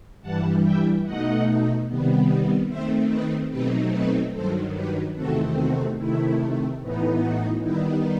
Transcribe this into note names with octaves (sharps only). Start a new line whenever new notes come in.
G2 E3 G3 F#5 A5
E5 G5
B2 A3 D#4 D#5 F#5
C3 D#3 G3 B3
D#3 A3 C4 C5 E5
B4 D#5
B2 F#3 A3 C4 D#4 G4 B4
B4 D#5
G2 D#3 F#3 A4 C5
G4 B4
E2 C3 D#3 A3 C4 F#4 A4
F#4
C3 D#3 A3 E4
A2 E3 B3 D#4
F#4
D#3 G3 B3 D#4 E4